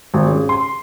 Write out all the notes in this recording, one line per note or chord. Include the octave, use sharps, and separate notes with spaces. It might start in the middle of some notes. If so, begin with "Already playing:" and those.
G#1
C#3
C6